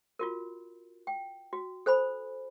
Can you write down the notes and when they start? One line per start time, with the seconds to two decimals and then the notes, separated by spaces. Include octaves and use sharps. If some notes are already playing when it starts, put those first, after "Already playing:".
0.19 F4 F#4 A#4
1.07 G5
1.53 F#4
1.86 A4 C5 G#5 B5